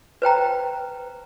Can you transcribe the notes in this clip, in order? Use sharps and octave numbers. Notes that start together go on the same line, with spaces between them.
B4 C5 G5 A#5